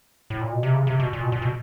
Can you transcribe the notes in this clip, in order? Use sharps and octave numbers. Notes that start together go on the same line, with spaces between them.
A2
A#2
B2
C3
C#3
C3
B2
A#2
B2
A#2
B2